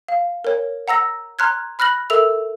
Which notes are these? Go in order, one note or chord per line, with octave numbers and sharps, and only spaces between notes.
F5
A#4 C#5
F#5 A#5 E6 A#6
A#5 C6 F6 F#6 G#6
B5 F6 F#6 A#6 F#7
A4 A#4 E5 E6 F7